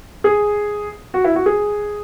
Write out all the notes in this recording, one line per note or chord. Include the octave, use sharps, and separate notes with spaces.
G#4
F#4
E4
F#4
G#4